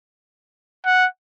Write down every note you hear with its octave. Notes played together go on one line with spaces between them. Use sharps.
F#5